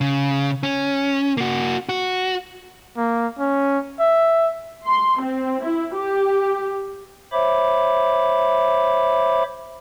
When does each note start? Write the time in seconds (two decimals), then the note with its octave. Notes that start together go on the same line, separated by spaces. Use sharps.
0.01 C#3
0.63 C#4
1.37 A#3 F#4
1.89 F#4
2.97 A#3
3.39 C#4
4.00 E5
4.87 C6
5.22 C4
5.64 E4
5.95 G4
7.32 C5 C#5 E5 B5 D6